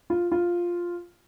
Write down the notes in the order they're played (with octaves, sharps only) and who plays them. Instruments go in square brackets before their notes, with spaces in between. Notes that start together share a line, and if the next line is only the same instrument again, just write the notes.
[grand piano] F4
F4